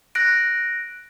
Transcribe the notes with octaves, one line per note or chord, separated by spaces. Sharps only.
F#6 A#6 D7